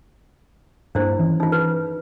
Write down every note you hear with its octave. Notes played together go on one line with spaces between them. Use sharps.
G2 A#3 D4 E4 C5
D#3 E3 C#4
D#4 F4
B4